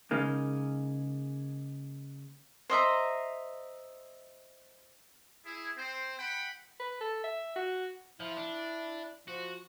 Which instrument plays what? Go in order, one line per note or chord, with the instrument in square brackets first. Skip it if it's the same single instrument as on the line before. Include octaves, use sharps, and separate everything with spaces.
[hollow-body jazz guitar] C#3 G#3 A#3 D#4
[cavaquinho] C5 D#5 E5 A#5
[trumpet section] E4 G#4
C4 C5
F#5 G5 B5
[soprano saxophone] B4
A4
E5
F#4
[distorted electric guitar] F3 [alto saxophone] E4
[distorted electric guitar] D4
[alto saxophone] F3 [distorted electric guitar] F#4